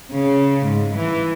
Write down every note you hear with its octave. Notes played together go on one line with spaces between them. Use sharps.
C#3
G#2
E3